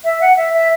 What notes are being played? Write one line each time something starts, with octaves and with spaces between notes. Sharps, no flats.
E5
F#5
E5
E5